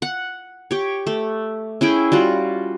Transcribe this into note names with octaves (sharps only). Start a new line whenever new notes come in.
F#5
G4 C#5
A3
C#4 E4 G#4 G5
G3 F4 F#4